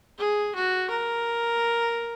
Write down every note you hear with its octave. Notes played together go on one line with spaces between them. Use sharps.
G#4
F#4
A#4